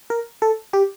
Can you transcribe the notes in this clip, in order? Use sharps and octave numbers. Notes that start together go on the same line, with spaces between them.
A#4
A4
G4